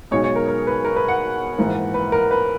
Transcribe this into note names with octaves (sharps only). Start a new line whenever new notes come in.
B1 B2 G#3 D#4 C#5
C#5
A#4
A#4
B4
A#4
B4
F#5
A#1 G#2 E3 A#3
B4
A#4
B4